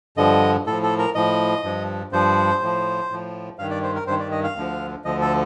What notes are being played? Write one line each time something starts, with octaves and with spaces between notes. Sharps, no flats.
G2 D3 F3 D#5
A2 F3 A4
A4
A#4
A2 F3 D#5
G2 F3
G2 F3 C5
A2 F3
A2 F3
G2 D#3 F5
D5
C5
A#4
G2 D#3 C5
D5
D#5
F5
D2 D3 F3
D2 D3 F3 D#5
A4